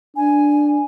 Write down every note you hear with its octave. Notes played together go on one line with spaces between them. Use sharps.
D4 G#5